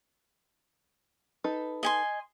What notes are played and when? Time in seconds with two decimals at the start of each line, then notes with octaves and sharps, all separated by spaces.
1.44 D#4 A4 B4
1.83 D#5 G#5 C6